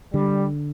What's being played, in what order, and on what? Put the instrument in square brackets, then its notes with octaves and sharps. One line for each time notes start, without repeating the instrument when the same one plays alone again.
[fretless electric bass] D3 [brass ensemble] G3